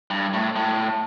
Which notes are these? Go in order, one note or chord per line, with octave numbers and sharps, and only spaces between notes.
G2
A2
A2